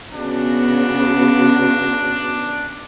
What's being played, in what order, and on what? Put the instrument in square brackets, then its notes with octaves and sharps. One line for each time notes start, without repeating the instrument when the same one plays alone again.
[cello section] C#3 B3 F#4 [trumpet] D4